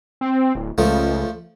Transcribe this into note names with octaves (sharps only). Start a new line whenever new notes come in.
C4
D1
C#2 F3 A3